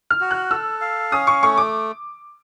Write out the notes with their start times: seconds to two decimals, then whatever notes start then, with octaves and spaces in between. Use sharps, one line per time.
0.10 F6
0.21 F#4
0.31 F#6
0.50 A4 E6
0.81 F5
1.12 C#4 D#6
1.27 C#6
1.42 A3 C#6
1.57 D6